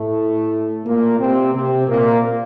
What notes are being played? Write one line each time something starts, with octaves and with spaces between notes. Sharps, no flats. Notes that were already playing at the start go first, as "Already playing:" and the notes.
Already playing: A2 A3
A#2 A#3
C3 C4
C3 C4
A#2 A#3